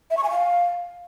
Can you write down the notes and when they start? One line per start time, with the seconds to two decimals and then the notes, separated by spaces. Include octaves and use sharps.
0.11 E5
0.17 C#6
0.24 G#5
0.30 F5